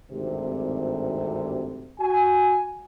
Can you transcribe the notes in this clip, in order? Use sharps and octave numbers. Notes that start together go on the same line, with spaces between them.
G#1 D2 G2 C3
F#4 G#5